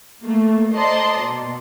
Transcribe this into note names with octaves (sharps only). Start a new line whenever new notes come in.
A3 A#3
C5 D5 D#5 A5 A#5 C6
B2